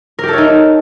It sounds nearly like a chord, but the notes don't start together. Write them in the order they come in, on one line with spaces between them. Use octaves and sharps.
A#4 G4 A4 C#5 D#4